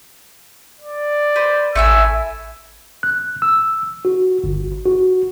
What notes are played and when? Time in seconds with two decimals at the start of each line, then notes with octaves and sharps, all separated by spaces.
0.81 D5
1.36 B4 C5
1.75 A1 A3 E4 G#5 E6
3.03 F#6
3.42 E6
4.05 F#4
4.44 G1
4.86 F#4